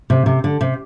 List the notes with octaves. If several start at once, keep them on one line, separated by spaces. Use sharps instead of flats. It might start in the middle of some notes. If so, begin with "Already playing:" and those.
C3
C3
D3
C3